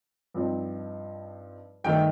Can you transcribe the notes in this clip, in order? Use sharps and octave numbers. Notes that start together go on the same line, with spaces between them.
G2 F3 C4 D#4
G2 D#3 A3 G5